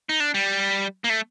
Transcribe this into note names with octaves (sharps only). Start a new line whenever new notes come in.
D#4
D4
G3
A#3
A3